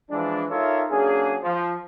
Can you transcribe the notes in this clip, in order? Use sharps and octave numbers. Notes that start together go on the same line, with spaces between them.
E3 F3 G#3 D4
D#4 F4 A4 A#4 C#5 E5
F#3 A#3 C#4 D4 G#4
F3